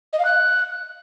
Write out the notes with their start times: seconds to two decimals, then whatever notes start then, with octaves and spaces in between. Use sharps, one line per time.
0.13 D#5
0.19 F5
0.25 F#6